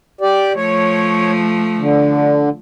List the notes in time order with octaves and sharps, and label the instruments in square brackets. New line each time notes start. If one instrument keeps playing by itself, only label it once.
[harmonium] G4 D5
[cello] F3 A3 [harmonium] C#5
[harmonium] D3